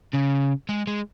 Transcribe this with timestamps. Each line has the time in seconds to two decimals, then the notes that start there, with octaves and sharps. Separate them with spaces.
0.14 C#3
0.69 G#3
0.87 G#3